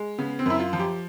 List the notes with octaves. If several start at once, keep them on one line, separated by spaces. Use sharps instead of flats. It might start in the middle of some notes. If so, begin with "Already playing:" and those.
Already playing: G#3
C#3 B3
C4
F#2 E4
F4
F3
G4